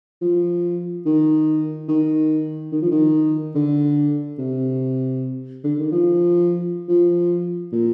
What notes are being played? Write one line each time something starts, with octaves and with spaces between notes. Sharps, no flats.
F3
D#3
D#3
D#3
F3
D#3
D3
C3
D3
D#3
F3
F3
A#2